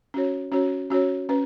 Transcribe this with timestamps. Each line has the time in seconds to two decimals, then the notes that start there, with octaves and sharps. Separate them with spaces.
0.14 C#4 F#4 C#5
0.52 C#4 F#4 C#5
0.90 C#4 F#4 C#5
1.29 C#4 B4